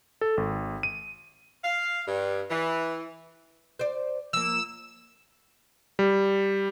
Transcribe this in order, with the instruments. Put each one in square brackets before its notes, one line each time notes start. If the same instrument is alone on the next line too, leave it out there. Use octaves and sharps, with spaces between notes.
[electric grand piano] A4
G#1
D#7
[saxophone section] F5
G2
E3
[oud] C5 D5
[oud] F3 A#3 [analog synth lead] E6
[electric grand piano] G3